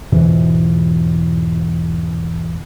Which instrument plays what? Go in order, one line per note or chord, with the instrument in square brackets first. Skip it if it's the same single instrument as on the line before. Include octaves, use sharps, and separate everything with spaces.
[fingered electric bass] E2 G#2 B2 E3